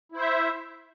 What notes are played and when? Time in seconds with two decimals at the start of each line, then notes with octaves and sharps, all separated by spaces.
0.12 E4
0.16 C5
0.20 E5